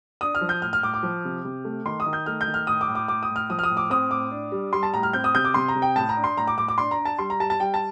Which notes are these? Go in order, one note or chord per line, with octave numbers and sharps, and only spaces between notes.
D4 D#6
F6
F3
G6
A2 F6
F6
A2 D6
D6
F3
C3
C3
A3
D#3 C6
D#6
D#3
G6
A3 F6
G6
D#3
F6
A2 D#6
D6
A2
D6
A2 D6
D#6
A2
F6
F3 D#6
F6
D#6
A2
D6
C4 D#6
A2 D6
D4
G3
G3 C6
A5
A2 A#5
F6
C4 G6
D#6
C3 G6
D6
C3 C6
A#5
C3
G5
A2 A5
A#5
D4
C6
A2 A#5
D6
A2 D6
D6
D4 C6
A#5
D4
A5
G3 C6
A#5
G3 A5
A5
G3 G5
A5